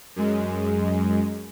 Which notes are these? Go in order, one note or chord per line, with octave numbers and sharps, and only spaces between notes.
F#2 G#3